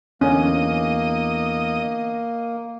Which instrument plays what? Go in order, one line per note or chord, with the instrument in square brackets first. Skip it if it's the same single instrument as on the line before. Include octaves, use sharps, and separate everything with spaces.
[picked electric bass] E2 D3 [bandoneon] A#3 [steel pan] C#4 [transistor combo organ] D#5